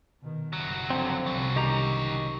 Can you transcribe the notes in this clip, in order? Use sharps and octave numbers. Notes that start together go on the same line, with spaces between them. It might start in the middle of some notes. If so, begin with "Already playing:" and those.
B2 D#3
F#1 C2 F#3
D3 F3 C4
C2 C#3 F#3
D#3 G4 A#5